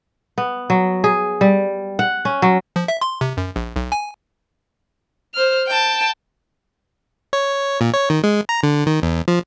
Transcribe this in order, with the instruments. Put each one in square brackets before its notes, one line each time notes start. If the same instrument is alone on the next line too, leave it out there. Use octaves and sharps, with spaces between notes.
[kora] B3
F#3
G#4
G3
F#5
C#4
F#3
[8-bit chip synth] F3
E5
C6
C3
F#2
A#1
B1
G#5
[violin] C5 F6
G5 A5
[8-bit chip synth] C#5
A#2
C#5
D#3
G#3
A#5
D3
D#3
E2
F3